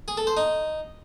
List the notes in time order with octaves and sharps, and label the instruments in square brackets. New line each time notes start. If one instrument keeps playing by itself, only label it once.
[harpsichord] G#4
A4
C5
D#4